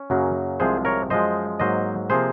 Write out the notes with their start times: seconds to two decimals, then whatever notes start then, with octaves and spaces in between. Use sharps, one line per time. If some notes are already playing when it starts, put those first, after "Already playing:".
Already playing: C#4
0.10 F#2 C#3 F#3 A#3
0.60 C2 C3 F3 G#3 G#4 C5
0.85 A#4 C#5
1.10 F#2 F3 G#3 C5 D#5
1.60 G#2 F#3 A#3 C5 D#5
2.10 C3 F3 A#3 G#4 C5